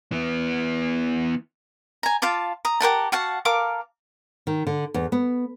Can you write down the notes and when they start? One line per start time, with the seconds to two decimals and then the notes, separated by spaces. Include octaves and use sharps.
0.12 E3 B3
2.03 G#5 A#5
2.22 F4 F5 A5 D6
2.65 A#5 D#6
2.80 G4 A#4 F#5 A5
3.12 F#4 F5 F#5 A5
3.45 A4 A#4 F5 D6
4.47 D#3
4.67 D3
4.94 E2
5.12 B3